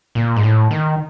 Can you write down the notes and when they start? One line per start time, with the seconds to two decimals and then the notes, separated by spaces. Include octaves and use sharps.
0.15 A#2
0.36 G#2
0.43 A2
0.71 D#3